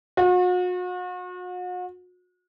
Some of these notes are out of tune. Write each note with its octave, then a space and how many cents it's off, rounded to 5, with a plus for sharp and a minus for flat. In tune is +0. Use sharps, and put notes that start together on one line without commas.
F#4 -40